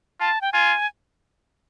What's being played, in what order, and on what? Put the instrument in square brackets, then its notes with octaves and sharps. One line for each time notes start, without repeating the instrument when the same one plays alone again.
[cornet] F4 [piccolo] A5
[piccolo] G5
[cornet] F4 [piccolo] G#5